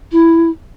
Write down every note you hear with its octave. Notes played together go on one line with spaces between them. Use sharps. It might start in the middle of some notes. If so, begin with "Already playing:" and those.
E4